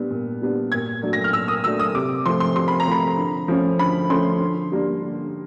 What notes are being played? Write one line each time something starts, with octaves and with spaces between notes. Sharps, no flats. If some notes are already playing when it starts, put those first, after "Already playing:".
Already playing: A#2 G3 B3 D4
A#2
G3 B3 D4
A#2 G#6
F#3 A3 D4
A#6
F6
A#2 E6
D#6
F#3 A3 D4 E6
D#6
C3 D6
F3 A3 C6
C6
C3 C6
B5
A#5
F3 A3 B5
D3
F3 A3 C#4
D3 B5
F3 A3 C#4 C6
D3
G3 A#3 D4
D3